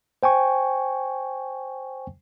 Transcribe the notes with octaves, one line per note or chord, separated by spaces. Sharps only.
C5 G5 G#5 C#6